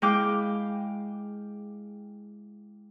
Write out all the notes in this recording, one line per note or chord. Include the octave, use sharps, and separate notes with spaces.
G#3 E4 F5 G5 D6